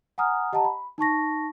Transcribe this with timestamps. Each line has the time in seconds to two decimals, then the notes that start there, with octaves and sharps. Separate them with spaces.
0.18 F#5 G#5 A#5 D#6 F6
0.53 G4 D#5 F#5 A5 A#5
0.65 B5
0.98 D#4 A5 C#6 A#6